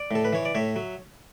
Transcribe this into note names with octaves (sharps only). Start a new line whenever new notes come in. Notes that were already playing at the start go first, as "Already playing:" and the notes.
Already playing: D5
A2 A4
B4
E3 C#5
D5
A2 C#5 E5
F#3